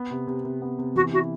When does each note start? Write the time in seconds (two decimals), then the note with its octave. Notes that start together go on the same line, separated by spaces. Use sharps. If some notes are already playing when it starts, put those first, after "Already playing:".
Already playing: B3
0.11 C3
0.27 C3
0.44 C3
0.62 B3
0.79 C3
0.96 E3 F#4
1.13 E4 F#4